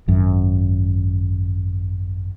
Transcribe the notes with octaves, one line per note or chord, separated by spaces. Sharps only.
G#1 F#2